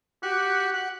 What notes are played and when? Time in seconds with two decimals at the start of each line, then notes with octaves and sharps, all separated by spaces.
0.23 F#4 G4
0.74 F#5